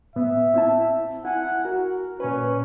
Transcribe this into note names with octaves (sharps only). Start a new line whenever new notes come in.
A2 B3 E5
C4 E4 A5
E4 F#5 G#5
F#4 A#4
A#2 C#4 B4